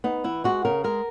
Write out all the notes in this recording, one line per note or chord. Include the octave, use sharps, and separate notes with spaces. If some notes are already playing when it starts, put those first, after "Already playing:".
B3 D#4
E3 E4
G#3 F#4
C#3 A#4
G#3 A#4